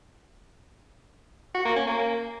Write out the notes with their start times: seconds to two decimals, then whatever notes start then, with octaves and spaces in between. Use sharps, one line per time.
1.54 F#4
1.65 A#3
1.76 C#4
1.87 A#3